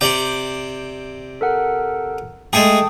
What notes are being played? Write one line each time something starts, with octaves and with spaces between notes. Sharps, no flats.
C3 D5 G5
A4 A#4 F#5
G#3 A3 G#4 G5 A5 D#6